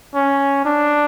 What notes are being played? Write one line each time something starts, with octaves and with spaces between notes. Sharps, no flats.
C#4
D4